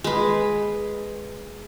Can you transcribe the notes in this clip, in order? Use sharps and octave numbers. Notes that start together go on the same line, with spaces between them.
G#3 B4